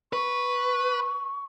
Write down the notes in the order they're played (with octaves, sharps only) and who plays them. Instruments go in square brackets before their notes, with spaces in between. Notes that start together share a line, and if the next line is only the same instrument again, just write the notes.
[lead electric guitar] B4 [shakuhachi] C#6